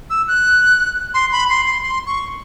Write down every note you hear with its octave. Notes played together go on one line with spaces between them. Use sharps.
E6
F#6
C6
B5
C6
C6
C6
C#6